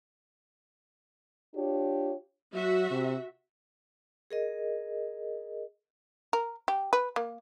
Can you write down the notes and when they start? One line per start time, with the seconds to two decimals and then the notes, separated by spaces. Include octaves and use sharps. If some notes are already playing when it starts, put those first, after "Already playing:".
1.54 D4 F4 G4 C#5
2.54 F#3 F#4 E5
2.91 C3
4.31 G#4 A#4 D#5
6.33 A#4
6.68 G4
6.93 B4
7.16 A#3